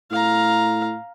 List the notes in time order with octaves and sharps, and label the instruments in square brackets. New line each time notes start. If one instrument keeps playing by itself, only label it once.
[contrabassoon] A2 [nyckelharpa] F5 A#5